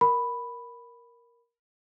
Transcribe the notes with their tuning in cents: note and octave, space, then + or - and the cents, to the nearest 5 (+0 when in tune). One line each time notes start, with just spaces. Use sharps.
A#4 +5 B5 +0